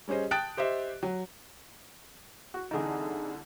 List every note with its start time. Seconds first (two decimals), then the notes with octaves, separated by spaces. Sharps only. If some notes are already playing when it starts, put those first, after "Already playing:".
0.08 G3 C#4 G#4 C5 D#5
0.31 G5 A5 D#6 F#6 A6 D7
0.57 G4 C5 D#5 E5
1.03 F#3
2.54 F#4
2.71 C2 D3 E3 D#4 G#4